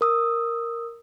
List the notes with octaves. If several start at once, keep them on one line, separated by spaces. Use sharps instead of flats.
A#4 D#6 E6